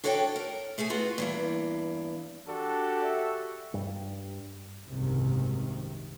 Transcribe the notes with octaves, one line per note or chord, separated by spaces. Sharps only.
D4 F#4 A4 C#5 D5 G5
A#4
A3 G#4 A4 G#5
B3 F4 F#4
E2 G2 A#3
D4 F#4 G4 A4
E5
G2 G3
F#1 C2 G#2 C3 D#3